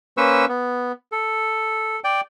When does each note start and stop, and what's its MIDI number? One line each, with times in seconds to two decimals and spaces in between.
0.17 0.45 58
0.17 0.45 61
0.17 0.45 71
0.17 0.45 72
0.17 0.45 85
0.17 0.45 88
0.49 0.92 59
1.12 2.00 69
2.04 2.21 74
2.04 2.21 79